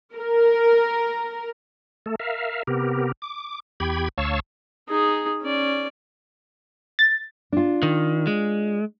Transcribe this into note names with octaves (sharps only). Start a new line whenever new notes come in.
A#4
A3 A4
A#4 E5 F5
C3 B3 G4 A#4
D6
E2 G4 G5 B5 G#6
D2 C#5 F5 A5 C#6 E6
D#4 G#4
C#4 D5
A6
D4 F4
D#3
G#3